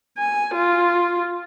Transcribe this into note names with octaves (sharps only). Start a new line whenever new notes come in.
G#5
F4